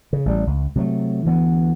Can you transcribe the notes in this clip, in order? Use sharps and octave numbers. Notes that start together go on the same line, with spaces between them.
C#3
A1 G3
C#2
C3 F#3 G3 A3
D2 E3 A3 B3